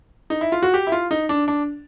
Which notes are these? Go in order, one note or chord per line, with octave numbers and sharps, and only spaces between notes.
D#4
E4
F4
F#4
G4
E4
F4
D#4
D4
D4